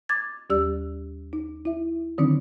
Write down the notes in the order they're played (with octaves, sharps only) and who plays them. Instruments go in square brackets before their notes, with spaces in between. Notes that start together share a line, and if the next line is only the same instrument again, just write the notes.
[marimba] D6 G#6 A6
D#2 G3 G4 D5 E6
D#4
E4 E5
D3 D#3 F#3 C4 D4 D#4